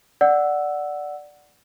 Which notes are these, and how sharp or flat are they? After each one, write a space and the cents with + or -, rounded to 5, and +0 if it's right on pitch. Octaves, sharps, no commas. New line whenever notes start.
D5 +0 F#5 +0 E6 +0